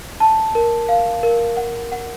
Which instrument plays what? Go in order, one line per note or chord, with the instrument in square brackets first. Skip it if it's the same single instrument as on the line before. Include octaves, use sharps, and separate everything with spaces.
[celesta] A5
A#4
F5
A#4
F#5
F#5